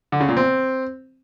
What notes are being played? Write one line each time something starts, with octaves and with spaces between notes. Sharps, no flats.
D3
C#3
A#2
C4